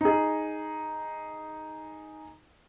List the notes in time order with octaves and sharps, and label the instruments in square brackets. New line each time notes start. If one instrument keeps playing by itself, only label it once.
[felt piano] D#4 G#4